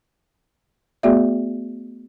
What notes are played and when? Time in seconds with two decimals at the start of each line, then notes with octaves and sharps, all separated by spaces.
1.03 A3 B3 F#4 G#4 D5 E5